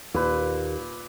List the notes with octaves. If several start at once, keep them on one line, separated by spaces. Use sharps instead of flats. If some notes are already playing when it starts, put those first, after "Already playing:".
D#2 A#2 B4